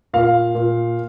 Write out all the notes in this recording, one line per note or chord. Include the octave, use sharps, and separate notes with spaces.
A#2 F5
A#2